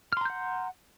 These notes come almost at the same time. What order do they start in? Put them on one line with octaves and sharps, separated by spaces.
F6 C6 A#5 G6 F#5